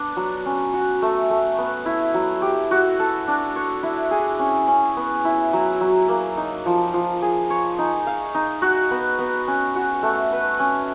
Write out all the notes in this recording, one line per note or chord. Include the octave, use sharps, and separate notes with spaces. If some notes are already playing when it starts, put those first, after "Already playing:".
Already playing: B3 D4
F#3
C#4
F#4
A3
A3
B3
E4
F#3
G4
F#4
A4
D4
C#5
E4
G#4
C#4
C#4
B3
E4
F#3
F#3
A#3
D#4
F3
F3
G#4
C#5
D#4
F5
D#4
F#4
B3
B3
C#4
F#4
A3
B4
C#4